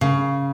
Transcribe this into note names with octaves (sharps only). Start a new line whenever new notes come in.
C#3